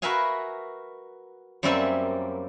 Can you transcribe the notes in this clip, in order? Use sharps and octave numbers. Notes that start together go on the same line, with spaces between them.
F#4 A#4 B4 E5 F5 G#5
F#2 G3 A#3 C4 E5 G#5